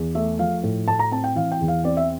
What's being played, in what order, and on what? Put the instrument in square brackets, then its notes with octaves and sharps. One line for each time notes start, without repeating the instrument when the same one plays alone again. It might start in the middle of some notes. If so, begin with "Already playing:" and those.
Already playing: [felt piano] E2
A3 E5
F3 F5
A2
A2 A5
A#5
C4 A5
G5
E3 F5
G5
E2
F5
C4 D5
E5